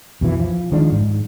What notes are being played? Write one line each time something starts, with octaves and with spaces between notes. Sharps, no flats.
F2 B2 E3
F3
D#3 F3 G#3 D4
G#2